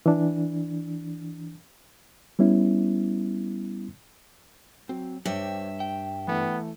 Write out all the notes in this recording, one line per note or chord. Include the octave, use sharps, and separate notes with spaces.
E3 D4
G3 B3 C#4 E4
F#3 C4
G2 G4 C5 C#5 E5 G5
G5
E3 A3 B3